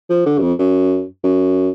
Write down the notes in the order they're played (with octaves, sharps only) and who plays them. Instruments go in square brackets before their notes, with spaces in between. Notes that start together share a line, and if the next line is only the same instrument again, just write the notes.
[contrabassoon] F3
D3
F#2
F2
F#2
F#2